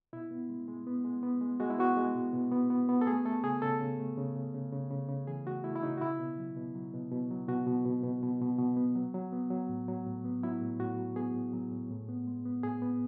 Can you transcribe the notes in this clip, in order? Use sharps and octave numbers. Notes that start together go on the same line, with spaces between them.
B2 E4
B3
G#3
G#3
B3
G#3
B3
G#3
G#3 F#4
E4
B3 F#4
G#3
B2
B2
B3
B3
B3
A4
A3 G#4
A3 A4
C#3 G#4
C#3 A4
C#3
A3
C#3
C#3
C#3
C#3
C#3
C#3
E3 G#4
A3 F#4
A3 E4
E4
C#3 D#4
F#4
B2 E4
B2
F#3
B2
F#3
B2
B2
F#3
B2 F#4
B2
B2
B2
B2
B2
B2
B3
F#3
F#3
B3
F#3
A2
F#3
A2
B3
F#3 E4
A2
A2 F#4
F#3
B3 G#4
A2
F#3
A2
A2
B3
G#3
B3
A2 G#4
B3